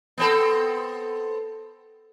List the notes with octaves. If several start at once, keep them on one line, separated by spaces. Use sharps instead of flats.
B3 C4 A4